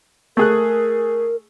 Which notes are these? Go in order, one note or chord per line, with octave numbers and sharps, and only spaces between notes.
A3 G#4 A#4 F#6